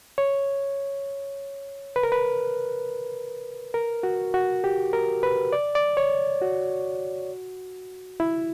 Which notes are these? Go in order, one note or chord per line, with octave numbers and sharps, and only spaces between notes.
C#5
B4
A#4
B4
A#4
F#4
F#4
G4
A#4
B4
D5
D5
C#5
F#4
E4